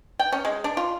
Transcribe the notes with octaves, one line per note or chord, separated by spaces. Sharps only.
G5
C#4
G#3
D4
F4